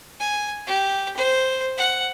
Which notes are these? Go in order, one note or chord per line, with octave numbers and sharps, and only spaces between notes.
G#5
G4
C5
F#5